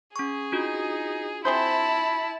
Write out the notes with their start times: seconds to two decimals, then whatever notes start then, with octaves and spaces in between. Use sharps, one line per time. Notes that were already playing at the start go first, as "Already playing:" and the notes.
0.16 C#4 G#4 C#6
0.52 D4 D#4 F4 F#4
1.45 C4 E4 G#4 C5 A5 B5